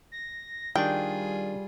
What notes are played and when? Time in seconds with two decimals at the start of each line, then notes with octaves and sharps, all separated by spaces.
0.12 A#6
0.76 D#3 G3 D4 F4 G#4 G5